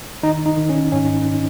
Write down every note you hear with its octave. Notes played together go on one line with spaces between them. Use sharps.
D#3 D#4
D#4
D#3
C#4
G#2 C#4